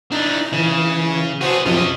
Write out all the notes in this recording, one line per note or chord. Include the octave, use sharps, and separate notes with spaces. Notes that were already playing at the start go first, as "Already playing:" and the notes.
E3 D4 D#4
C#3 E3
F#4 G#4 B4 C5 A5
F#2 C3 F3 C#4 D#5